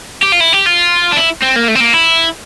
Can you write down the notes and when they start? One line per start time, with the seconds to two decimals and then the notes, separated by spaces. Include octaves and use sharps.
0.23 G4
0.33 F4
0.41 E4
0.53 G4
0.66 F4
1.12 D4
1.17 E4
1.42 C4
1.56 A#3
1.68 A3
1.75 C4
1.80 A#3
1.94 E4